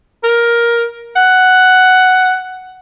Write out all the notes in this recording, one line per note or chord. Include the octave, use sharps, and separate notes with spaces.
A#4
F#5